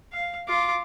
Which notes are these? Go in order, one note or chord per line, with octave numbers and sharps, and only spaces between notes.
F5
F4 D6